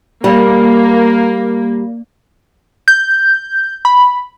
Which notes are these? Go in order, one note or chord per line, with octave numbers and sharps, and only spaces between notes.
G3 A#3
G6
B5